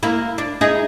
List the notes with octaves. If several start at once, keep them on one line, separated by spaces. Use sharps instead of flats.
A#3 E4
D4
D#4 E4 G#4